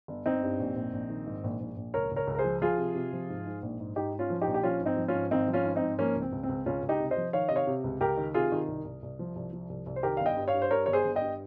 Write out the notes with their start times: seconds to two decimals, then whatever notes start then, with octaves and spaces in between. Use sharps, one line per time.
0.08 G1
0.26 G1 C4 D#4
0.43 G2
0.60 A#1
0.76 A#1
0.93 A#1
1.10 D#3
1.26 G#2
1.44 A#1
1.60 A#1
1.77 A#1
1.94 C#2 A#4 C#5
2.11 C#2
2.16 A#4 C#5
2.27 C#2
2.35 A#4
2.38 G#4 C5
2.44 F3
2.62 F3 F4 G#4
2.78 C3
2.95 C3
3.13 F3
3.29 G#2
3.46 G#2
3.62 A#1
3.80 G#2
3.96 G#2 D#4 G4
4.13 G#2
4.19 C#4 F4
4.30 F3
4.41 D#4 G4
4.47 A#1
4.54 G4
4.63 F3 C#4 F4
4.80 G#2
4.86 C4 D#4
4.97 F3
5.08 C#4 F4
5.14 G#2
5.31 G#1 C4 D#4
5.48 F3
5.53 C#4 F4
5.65 G#2
5.76 C4 D#4
5.82 G#2
5.99 F3 A#3 C#4
6.16 C#2
6.22 C4
6.32 C#2
6.43 C4
6.49 C#2
6.66 C#2 C#4 F4
6.83 C#2
6.89 D#4 G4
7.00 C3
7.11 C5 D#5
7.17 F3
7.33 D#3 C#5 F5
7.49 C3 D#5
7.56 C#5 F5
7.67 C3
7.84 C#2
8.00 C#2 G4 A#4
8.17 D#3
8.34 C3 F4 G#4
8.52 D#3
8.68 C2
8.85 C2
9.02 C2
9.19 F3
9.36 C2
9.53 F3
9.69 C2
9.86 C2
9.96 C5
10.03 D#3 G4 A#4
10.17 G1 F5
10.26 D#5 G5
10.37 G2
10.48 C#5 F5
10.54 G2
10.62 C5
10.71 G2 A#4 C#5
10.86 G1 C#5
10.93 G#4 C5
11.05 G1
11.16 D#5 G5
11.21 G2